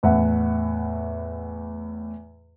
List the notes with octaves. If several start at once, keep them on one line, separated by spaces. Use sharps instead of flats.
E2 A2 E5 F#5